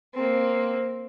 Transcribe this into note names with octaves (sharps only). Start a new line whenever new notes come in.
A#3 C4